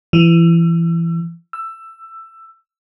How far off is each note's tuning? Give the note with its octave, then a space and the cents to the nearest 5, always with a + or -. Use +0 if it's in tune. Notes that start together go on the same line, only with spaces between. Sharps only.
E3 +25
E6 +15